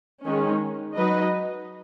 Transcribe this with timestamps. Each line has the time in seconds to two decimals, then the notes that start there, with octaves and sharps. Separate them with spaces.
0.25 D#3 G#3 C#4
0.96 F#3 D#4 B4 D#5